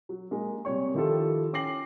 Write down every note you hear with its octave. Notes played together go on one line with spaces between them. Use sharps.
F#3
G#3 A#3
C3 G3 C#5 C#6
D#3 F3 E4 F4 G4 A4
C#4 G5 D6 A#6 C7 F#7